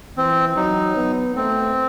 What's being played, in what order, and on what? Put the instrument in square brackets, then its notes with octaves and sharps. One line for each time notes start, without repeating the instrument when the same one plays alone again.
[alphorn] E3 [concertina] C4
[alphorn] F#3 [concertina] D#4
[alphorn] B3
[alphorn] A3 [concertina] C4